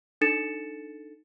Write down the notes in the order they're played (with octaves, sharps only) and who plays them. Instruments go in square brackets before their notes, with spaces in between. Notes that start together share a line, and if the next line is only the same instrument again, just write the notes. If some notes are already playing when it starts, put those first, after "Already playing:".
[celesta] D4 D#4 A4 A6 C#7 E7